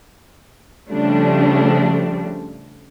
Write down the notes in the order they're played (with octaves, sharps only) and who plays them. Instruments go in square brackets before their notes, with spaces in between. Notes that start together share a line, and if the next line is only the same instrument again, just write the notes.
[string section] C#3 F3 G3 A3 D4